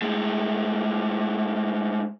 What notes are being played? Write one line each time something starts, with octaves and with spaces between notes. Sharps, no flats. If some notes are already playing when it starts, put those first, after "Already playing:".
A2 G#3